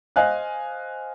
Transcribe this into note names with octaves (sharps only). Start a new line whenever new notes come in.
C5 D#5 F5 G#5 F#6